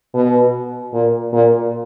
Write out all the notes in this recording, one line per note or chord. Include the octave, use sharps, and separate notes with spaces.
B2
A#2
A#2